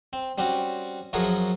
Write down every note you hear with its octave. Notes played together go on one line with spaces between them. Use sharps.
C4
G3 C4 C#4 F#4
F#2 F3 F#4 G#4 A#4 C#5